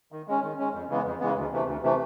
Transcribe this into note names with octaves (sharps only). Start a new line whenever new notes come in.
D#3
G#3 C#4
D#3
G#3 C#4
F2
C#3 E3 G#3 B3
F2
C#3 E3 G#3 B3
D2
C3 E3 A3
D2
C3 E3 A3